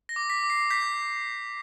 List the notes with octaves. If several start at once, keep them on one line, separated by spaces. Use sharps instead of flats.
A#6
D6
B6
D6
C7
G6 B6